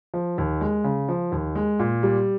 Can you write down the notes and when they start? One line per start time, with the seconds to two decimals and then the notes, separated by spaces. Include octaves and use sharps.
0.14 F3
0.38 D#2
0.61 G#3
0.84 C#3
1.09 F3
1.32 D#2
1.55 G#3
1.80 A#2
2.03 G3